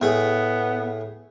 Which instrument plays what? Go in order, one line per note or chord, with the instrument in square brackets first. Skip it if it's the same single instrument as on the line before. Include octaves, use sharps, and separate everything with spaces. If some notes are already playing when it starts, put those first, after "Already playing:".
[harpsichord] A2 G#4 [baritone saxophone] B3